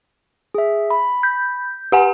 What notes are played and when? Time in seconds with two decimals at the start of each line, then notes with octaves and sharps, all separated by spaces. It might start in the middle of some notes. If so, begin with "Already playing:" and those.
0.55 G#4 E5
0.91 B5
1.23 G6
1.92 G4 F#5 G#5